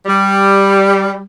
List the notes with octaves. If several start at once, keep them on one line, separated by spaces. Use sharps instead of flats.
G3